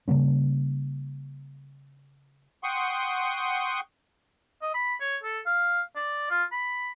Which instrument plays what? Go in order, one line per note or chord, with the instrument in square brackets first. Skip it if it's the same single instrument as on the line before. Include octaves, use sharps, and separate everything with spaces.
[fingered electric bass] C#3 G3 A#3 C#4
[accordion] F#5 G5 C6 C#6 D#6
[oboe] D#5
B5
C#5
A4
F5
D5
F4
B5